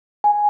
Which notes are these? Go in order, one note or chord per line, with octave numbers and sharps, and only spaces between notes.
G#5